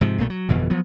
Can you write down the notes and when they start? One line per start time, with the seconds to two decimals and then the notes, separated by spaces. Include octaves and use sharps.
0.01 G#2 C3 F3
0.18 B1 A#2 A3 B3
0.30 F#3
0.49 G1 F2 B2 E3
0.70 F3 F#3 B3